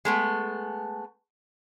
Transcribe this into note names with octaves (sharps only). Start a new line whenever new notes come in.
G#3 A3 B3